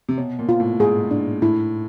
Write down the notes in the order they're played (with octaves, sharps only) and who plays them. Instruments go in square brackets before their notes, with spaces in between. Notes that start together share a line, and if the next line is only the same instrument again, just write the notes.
[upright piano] C3
[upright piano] B2 [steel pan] C#5
[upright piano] A#2
[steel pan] F4
[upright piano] A2
[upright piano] G#2 [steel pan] G#4
[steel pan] D4
[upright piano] A2 [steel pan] E4